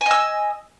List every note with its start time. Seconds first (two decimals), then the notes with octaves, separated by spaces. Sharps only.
0.01 G#5
0.06 D#5
0.11 E6